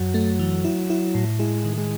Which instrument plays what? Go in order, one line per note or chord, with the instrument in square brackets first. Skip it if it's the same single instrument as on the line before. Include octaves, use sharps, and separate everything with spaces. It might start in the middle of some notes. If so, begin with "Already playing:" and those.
Already playing: [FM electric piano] F#2 [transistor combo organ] F#3
[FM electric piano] A3
E3
E4
E4
A2
[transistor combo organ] G#3 [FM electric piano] E4
[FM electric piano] D#3
[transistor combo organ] G#3